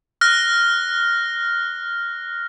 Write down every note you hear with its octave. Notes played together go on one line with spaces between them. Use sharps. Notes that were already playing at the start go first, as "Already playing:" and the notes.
F6 F#6 A#6